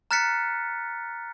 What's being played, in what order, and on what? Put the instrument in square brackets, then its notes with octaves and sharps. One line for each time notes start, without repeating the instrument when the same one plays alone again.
[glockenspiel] A#5 F6 F#6 A6 B6 C#7